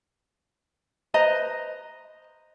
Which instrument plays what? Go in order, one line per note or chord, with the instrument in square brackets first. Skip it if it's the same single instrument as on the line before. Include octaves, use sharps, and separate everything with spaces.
[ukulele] B4 C5 D#5 A#5